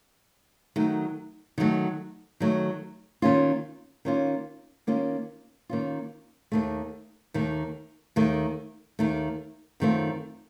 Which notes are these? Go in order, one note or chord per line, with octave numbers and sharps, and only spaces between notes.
D#3 F#3 A3
D#3 F#3 A3
D#3 F#3 A3
D#3 A#3 C#4 F4
D#3 A#3 C#4 F4
D#3 A#3 C#4 F4
D#3 A#3 C#4 F4
D#2 D#3 A3
D#2 D#3 A3
D#2 D#3 A3
D#2 D#3 A3
F#2 D#3 A3 C4 F4